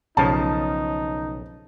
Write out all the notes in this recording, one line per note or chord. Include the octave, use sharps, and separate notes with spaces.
B1 C#3 F3 D#4 A5